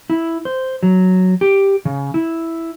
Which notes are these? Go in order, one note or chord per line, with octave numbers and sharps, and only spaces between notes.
E4
C5
F#3
G4
C#3
E4